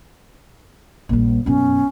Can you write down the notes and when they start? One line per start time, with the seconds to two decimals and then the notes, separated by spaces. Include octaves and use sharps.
1.09 A#1 G3
1.46 B1 F#2 C#4